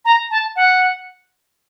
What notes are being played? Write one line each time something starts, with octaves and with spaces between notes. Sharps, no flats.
A#5
A5
F#5